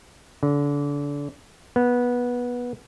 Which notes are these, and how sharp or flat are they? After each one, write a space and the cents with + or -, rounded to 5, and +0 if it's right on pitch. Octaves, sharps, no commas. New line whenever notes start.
D3 -30
B3 -15